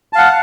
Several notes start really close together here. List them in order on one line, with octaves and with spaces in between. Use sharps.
A5 F5 F#5